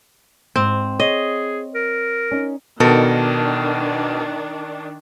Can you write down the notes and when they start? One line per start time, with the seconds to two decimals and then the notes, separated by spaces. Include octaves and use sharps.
0.56 G#2 C4
1.00 G#4 C#5 D#5
1.75 A#4
2.31 C#4 D#4
2.80 B2 D#3 D4 A4 A#4